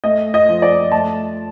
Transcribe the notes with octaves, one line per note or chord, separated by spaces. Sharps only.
A3 D#5
D#5
F3
D5
A3 A5